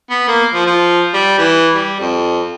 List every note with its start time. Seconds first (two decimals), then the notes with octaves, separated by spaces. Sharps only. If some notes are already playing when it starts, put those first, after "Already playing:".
0.10 B3
0.28 A#3
0.54 F3
0.67 F3
1.14 G3
1.39 E3
1.74 G3
2.00 F2